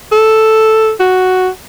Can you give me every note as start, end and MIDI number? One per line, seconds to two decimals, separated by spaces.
0.12 0.91 69
1.00 1.49 66